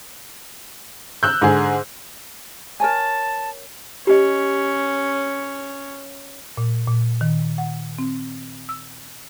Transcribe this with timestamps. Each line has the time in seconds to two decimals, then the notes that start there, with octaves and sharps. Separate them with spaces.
1.23 E6 F#6 G6
1.42 G#2 D3 G#4
2.80 A#4 C#5 G#5 A5
4.07 C#4 G4 D#5
6.57 A#2
6.87 A#2
7.21 D#3
7.58 F#5
7.98 C4
8.69 E6